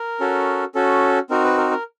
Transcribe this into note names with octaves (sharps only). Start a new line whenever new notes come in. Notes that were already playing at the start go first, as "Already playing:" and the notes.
Already playing: A#4
C#4 F#4 A4
C#4 F#4 A4
C4 D#4 F#4 A#4
B4
A#4
A#4